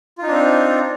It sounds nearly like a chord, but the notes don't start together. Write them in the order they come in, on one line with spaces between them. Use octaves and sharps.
F4 D#4 D4 C4